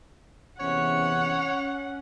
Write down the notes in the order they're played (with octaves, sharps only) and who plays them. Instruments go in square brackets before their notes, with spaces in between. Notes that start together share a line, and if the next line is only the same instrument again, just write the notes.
[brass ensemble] E2 C3 [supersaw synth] C#4 [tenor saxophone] C#5 [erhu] F#5